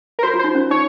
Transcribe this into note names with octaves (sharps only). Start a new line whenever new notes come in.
A#4
F#4 C5
F4
C5
D#4
C#4
D#4 C#5